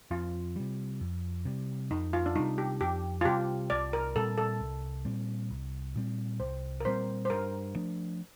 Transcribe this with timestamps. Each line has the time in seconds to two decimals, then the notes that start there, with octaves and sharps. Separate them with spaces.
0.11 F2 F4
0.56 C3 G3
1.01 F2
1.45 C3 G3
1.91 F2 D#4
2.13 F4
2.26 D4
2.35 C3 G3 D#4
2.58 G4
2.81 F2 G4
3.21 F4
3.25 C3 G3 G4
3.70 C2 D5
3.93 A#4
4.15 A#2 G3 C4 A4
4.38 A4
4.60 C2
5.05 A#2 G3 C4
5.50 C2
5.96 A#2 G3 C4
6.40 C2 C5
6.80 A#4
6.85 A#2 G3 C4 C5
7.25 C5
7.30 G2 A#4
7.75 F3 A3 D4